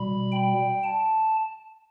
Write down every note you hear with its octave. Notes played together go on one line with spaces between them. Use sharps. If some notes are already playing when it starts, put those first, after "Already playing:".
Already playing: B2 G3 B5
G5
A5